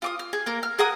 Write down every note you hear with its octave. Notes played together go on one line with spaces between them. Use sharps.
F4 D6 D#6
F6
G#4
A#3 A#4
F6
G#4 A#4 F#5 D#6